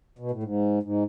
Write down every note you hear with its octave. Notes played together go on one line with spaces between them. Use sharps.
B2
A2
G#2
G#2